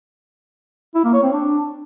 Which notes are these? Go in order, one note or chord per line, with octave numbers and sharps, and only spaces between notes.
E4
A#3
C#5
C4
D4